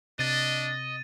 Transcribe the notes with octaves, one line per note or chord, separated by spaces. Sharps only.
C3 D4 D#5 A6 D#7